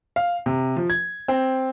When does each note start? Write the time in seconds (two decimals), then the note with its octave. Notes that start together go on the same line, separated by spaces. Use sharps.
0.16 F5
0.46 C3
0.77 F3
0.90 G#6
1.28 C4